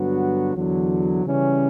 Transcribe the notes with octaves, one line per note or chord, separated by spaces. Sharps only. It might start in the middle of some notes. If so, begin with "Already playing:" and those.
Already playing: G2 D3 F#3 B3 F#4
E2 D3 F#3
C#3 E3 G3 C#4